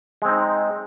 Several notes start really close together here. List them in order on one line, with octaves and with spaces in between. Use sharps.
G#3 C4 D#4